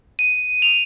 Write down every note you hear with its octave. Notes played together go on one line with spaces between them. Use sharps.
D#7
F7